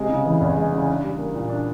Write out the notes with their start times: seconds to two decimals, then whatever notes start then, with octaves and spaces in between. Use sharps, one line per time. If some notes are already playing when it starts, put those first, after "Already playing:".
Already playing: C3 G#3
0.09 C#3
0.25 E3
0.41 E2
0.57 G#3
0.72 C#3
0.88 D4
1.03 G3
1.18 A#3
1.35 A#2
1.49 D4